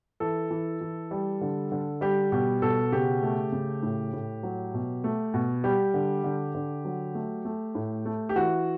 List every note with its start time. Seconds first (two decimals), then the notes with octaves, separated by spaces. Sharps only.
0.20 E3 A4
0.51 E3
0.81 E3
1.11 G3
1.41 D3
1.72 D3
2.01 G3 G4
2.32 B2 G4
2.62 B2 A4
2.92 C#3 G4
3.22 A3
3.52 C#3
3.83 A2
4.13 A2
4.43 F#3
4.74 B2
5.04 A3
5.34 B2
5.64 G3 G4
5.94 D3
6.24 D3
6.55 D3
6.85 F#3
7.15 A3
7.45 A3
7.75 A2
8.05 A3
8.29 G4
8.36 E3 F#4